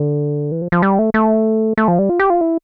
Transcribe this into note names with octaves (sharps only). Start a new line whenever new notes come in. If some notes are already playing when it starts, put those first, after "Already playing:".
Already playing: D3
E3
F3
F3
G3
A3
A3
A3
F3
G3
F4
G4
F4
E4